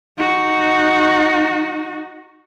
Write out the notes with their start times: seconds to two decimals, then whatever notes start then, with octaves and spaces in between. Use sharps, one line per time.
0.18 D#4 F#4